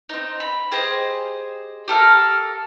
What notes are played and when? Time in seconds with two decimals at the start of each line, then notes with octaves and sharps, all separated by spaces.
0.09 C4 D#4
0.40 B5
0.72 G4 G#4 C5 D#5
1.88 G4 A4 A#4 F5